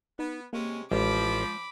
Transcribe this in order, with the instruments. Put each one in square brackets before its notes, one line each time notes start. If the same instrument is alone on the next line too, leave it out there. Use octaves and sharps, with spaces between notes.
[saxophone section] B3 [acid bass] D#4
[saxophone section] C3 G#3 C#4 [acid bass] A#3
[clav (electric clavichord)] A1 [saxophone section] F3 [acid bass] G#3 [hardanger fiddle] B5 D6